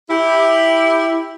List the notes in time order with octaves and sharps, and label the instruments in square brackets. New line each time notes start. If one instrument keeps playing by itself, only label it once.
[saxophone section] E4 G4